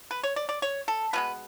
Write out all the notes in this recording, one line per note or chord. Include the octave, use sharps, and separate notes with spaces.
B4
C#5
D5
D5
C#5
A4
B2 G#3 B3 B4